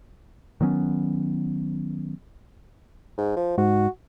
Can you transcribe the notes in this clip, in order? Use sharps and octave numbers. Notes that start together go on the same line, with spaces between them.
D#3 F#3 B3 C#4
G#2
F3
G#2 F#4